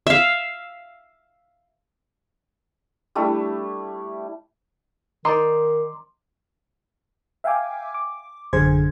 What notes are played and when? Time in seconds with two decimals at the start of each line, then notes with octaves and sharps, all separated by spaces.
0.07 E5 F5
3.15 G3 A3 D4 E4
5.25 D#3 D#4 C5 D5 C6 D6
7.44 E5 F5 G5 G#5 D6
7.94 D6
8.53 A1 F#2 D3 G#4 C5 G#6